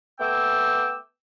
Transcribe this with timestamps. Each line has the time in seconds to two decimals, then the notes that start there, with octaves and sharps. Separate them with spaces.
0.20 A3 B3 G5 D6 E6